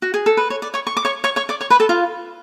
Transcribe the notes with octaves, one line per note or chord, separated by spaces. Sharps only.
F#4
G#4
A4
B4
C#5
D5
C#5 C#6
C#6
D6
C#5 C#6
C#5 C#6
C#5 C#6
D5 D6
C#5 C#6
B4 B5
A4 A5
F4 F5